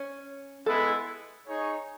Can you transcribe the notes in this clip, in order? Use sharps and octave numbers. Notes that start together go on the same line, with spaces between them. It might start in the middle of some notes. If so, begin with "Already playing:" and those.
Already playing: C#4
G#3 B3 E4 A4
D#4 G#4 C#5